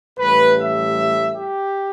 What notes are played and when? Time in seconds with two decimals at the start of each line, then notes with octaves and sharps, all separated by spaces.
0.18 A1 A2 G3 B4
0.57 E5
1.35 G4